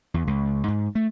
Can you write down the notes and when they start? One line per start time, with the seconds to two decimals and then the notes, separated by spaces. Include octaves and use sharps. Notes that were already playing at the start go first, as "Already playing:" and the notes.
0.14 E2
0.27 C#2
0.68 G#2
0.95 A3